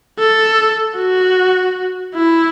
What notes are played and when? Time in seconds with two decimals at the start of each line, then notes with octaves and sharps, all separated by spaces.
0.19 A4
0.97 F#4
2.15 E4